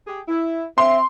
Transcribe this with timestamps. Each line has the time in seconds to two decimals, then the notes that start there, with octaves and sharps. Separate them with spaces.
0.07 G4 G#4
0.28 E4
0.78 C4 E5 C6